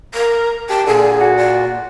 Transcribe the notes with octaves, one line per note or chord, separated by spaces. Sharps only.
A#4 A#5
G4 G5 A5
A#2 D3 G#4
F#4
D5